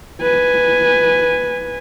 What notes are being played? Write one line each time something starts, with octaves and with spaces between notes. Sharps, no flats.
B4 G#5